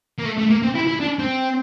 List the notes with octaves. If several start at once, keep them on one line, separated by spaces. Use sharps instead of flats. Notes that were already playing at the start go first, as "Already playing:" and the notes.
A#3
A3
A3
A#3
C4
E4
E4
D4
C4